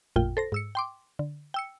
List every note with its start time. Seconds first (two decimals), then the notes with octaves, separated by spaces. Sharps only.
0.16 A1 F2 A#2 F4 G5
0.37 A4 C5 A#6
0.52 G#2 E6 C#7
0.75 G5 C6 D6
1.19 D3
1.54 G5 E6 C#7